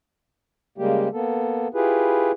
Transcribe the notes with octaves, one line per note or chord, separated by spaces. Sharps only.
C#3 G3 G#3 A#3 G4
A#3 B3 A4
E4 F4 G4 G#4 B4